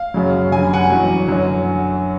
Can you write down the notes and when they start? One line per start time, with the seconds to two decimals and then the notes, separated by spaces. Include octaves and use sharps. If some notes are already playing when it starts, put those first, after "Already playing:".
Already playing: F5
0.14 F#2 C#3 F#3
0.52 F#2 D3 G3 G#5
0.73 F#5 G#5
0.90 E2 B2 F#3
1.28 F#2 D3 F#3